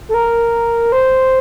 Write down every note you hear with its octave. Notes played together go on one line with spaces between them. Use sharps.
A4
A#4
C5